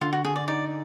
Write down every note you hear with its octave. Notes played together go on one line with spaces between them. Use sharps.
D3 F4
F#4
D3 G#4
D5
D#4 D5